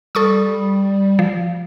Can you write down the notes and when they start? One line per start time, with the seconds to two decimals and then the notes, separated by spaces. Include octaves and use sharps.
0.15 G3 A4 C#6 D#6
1.19 F3